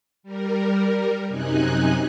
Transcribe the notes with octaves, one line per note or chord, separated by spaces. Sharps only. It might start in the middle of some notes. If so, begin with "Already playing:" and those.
G3 A#4
F#2 C3 D#4 G#5 F#6